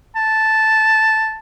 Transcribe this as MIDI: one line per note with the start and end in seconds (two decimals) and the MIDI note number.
0.16 1.38 81